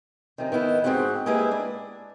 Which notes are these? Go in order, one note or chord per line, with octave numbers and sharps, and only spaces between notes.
F#2 C3 D#3
D#3 B3 E4 F#5
G#2 F#3 C4 F#4 G4 F#5
G#3 A#3 E4 G4 G#4 B4
D4